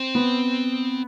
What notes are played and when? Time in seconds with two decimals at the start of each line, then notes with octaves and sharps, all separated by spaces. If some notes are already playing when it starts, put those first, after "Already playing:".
Already playing: C4
0.15 B3